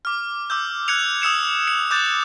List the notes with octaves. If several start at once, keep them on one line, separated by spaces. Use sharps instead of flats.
D6 F6
D6 E6 G6
F#6 G#6 C#7 F7
D#6 E6 C#7 E7
C#7
D6 F#6 G6 A6